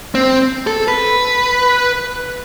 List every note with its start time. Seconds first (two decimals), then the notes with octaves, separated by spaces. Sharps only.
0.15 C4
0.67 A4
0.88 B4